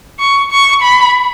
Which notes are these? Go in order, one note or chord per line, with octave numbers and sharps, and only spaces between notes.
C#6
C#6
B5